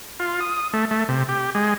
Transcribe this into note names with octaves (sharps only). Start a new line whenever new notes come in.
F4
D#6
A3
A3
C3
G4
G#3